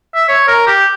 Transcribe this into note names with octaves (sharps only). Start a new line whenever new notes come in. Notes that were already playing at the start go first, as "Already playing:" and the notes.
E5
C#5
A#4
G4